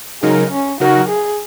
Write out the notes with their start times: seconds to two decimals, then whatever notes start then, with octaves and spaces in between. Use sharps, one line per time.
0.22 C#3 F#3 G#3 D#4 A#4
0.51 C#4
0.80 C#3 F#3 D#4 F#4 A#4
1.09 G#4